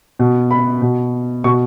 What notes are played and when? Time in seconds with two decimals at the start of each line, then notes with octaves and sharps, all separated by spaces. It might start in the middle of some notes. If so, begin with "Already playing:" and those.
0.19 B2
0.51 B5
0.82 B2
1.44 B2 C#6